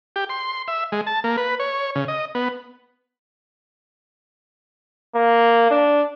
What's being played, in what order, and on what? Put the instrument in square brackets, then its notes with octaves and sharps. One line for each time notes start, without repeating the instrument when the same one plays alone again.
[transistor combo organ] G4
C6
E5
G#3
A5
A#3
B4
C#5
C#3
D#5
B3
[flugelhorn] A#3
D4